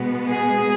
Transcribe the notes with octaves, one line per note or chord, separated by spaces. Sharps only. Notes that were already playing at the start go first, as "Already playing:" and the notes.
Already playing: B2 G#3 B3
G#4